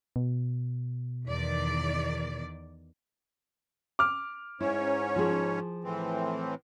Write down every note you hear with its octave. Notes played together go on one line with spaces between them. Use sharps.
B2
E2 D#3 D5
D6 F6
G#2 C#4 E4 C#5
F3 G#4
A2 E3 C4